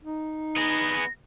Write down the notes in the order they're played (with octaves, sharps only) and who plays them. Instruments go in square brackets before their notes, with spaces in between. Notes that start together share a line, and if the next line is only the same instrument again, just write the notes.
[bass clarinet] D#4
[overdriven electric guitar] B3 G#4 [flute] A#6